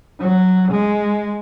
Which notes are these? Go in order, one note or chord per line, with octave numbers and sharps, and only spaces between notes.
F#3
G#3